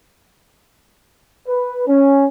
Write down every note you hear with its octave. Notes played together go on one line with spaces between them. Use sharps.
B4
C#4